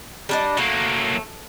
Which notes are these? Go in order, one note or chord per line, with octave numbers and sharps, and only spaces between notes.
G3 D4 D#5
F#3 A3 A#3